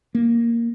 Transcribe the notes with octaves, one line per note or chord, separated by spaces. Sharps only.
A#3